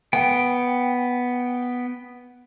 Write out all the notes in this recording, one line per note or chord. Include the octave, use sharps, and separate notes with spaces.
B3 G5